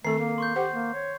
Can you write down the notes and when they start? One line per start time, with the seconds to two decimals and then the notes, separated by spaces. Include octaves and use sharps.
0.05 D#3 A3 C4 A4 C7
0.19 A#3
0.38 C6 C#6 G6
0.56 G4 C5 F#5
0.72 A#3
0.94 C#5